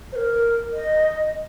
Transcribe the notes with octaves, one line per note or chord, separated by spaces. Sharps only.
C5
A#4
D#5